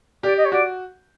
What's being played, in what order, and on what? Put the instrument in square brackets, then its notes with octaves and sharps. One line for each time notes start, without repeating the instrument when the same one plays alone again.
[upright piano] G4 [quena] D5
[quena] D#5
C#5
[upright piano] F#4 [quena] D5